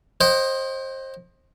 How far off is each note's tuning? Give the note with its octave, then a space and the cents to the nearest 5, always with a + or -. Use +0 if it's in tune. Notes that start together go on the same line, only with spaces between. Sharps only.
C5 +25 D#5 +0 G5 -40